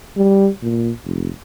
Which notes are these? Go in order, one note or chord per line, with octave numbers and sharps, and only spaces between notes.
G3
A#2
F1